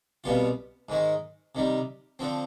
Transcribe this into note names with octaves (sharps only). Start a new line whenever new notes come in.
C2 B2 G3 B3 F4
G#2 D#3 G#3
C3 D#3 G3
D3 F3 C4